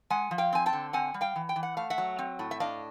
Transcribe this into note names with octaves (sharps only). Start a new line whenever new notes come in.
G#3 F#5 G#5
F3
F5 G5
C4 G#5
G5 A5
D3
C4 F#5 G#5
G3
F5 G5
E3
G5
E3
F#5
A3 F5
E5 F#5
F#3
C4
A2
E5
D4 D#5 F5